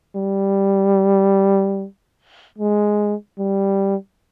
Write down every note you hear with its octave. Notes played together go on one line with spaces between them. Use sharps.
G3
G#3
G3